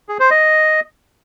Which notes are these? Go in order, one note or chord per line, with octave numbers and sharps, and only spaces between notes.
G#4
C5
D#5